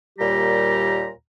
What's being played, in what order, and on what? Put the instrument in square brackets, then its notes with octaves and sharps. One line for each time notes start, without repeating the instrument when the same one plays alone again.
[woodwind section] D#2 A#2 G3 G4 A#5